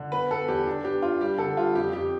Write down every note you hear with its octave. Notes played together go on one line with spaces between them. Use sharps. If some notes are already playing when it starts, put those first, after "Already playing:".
Already playing: D3
B3 B4
B3 A4
E2 G4
D4
B3 G4
D4 F4
G3 G4
D3 A4
G3 F4
F2 G4
F2 G4